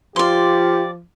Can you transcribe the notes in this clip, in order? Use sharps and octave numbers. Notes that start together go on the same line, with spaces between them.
F3 F4 G4 D5 C6